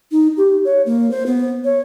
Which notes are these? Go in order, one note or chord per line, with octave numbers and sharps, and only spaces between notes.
D#4
G4
C#5
A#3
C5
B3
C#5